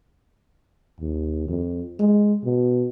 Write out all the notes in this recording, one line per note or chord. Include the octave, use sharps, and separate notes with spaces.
D#2
F2
G#3
B2